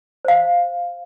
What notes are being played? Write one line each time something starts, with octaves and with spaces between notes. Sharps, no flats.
C5 F5